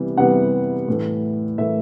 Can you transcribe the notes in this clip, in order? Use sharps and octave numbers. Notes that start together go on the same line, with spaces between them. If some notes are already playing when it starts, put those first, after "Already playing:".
Already playing: C3 E3 G3 B3
C3 E3 G3 B3 F#5
A2 E3 A3
A2 E3 A3 E5